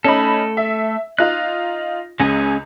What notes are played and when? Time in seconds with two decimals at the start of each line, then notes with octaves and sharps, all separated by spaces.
0.04 A3 C#4 D#4 A4 B5
0.57 E5
1.19 D#4 F4 F#6
2.20 C#2 G#3 C#4 G#4 G#5